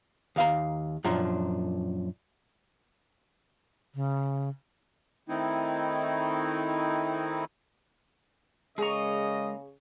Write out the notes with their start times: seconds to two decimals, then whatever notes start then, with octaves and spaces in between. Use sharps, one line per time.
0.36 D#2 F5 A#5
1.04 F#2 A#2 F3 D4
3.95 C#3
5.29 D#3 A3 C4 D#4 E4
8.78 C#3 G#3 A#3 G#4 D#5 A#5 C#6